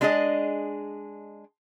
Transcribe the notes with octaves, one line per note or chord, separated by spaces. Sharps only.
G#3 D4 G#4 A4 D#5